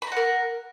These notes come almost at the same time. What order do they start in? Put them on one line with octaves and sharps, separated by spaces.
B5 A#5 F#5 A#4